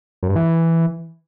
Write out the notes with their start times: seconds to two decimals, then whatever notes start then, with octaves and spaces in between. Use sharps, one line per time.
0.23 F#2
0.29 G2
0.36 E3